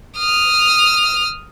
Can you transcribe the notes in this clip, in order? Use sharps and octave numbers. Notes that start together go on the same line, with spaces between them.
D#6 F6